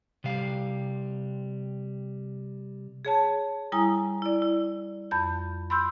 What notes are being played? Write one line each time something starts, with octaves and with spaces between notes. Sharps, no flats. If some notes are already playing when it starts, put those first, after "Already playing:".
C3 G3 F5
G#4 C#5 A5
G3 E4 G#5 A#5 D#6
E4 D5
E4
F2 B5 G6
B5 C6 E6 G6